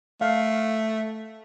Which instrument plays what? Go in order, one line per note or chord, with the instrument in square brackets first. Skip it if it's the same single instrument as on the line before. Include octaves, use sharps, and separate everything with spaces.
[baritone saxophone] A3 [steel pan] F5